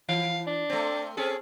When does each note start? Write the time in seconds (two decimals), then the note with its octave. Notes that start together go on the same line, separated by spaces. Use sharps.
0.09 E3 F5
0.47 D4
0.70 A3 C4
1.17 C4 C#4 G#4 A4